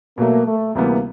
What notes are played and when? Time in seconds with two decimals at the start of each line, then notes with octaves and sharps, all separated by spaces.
0.18 B2 F#3 A3 A#3
0.46 A3
0.75 D2 C3 E3 G3 A#3 B3